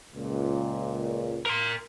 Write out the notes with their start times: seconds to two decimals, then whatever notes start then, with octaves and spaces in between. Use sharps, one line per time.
0.15 C#2 A#2
1.46 A#4 C6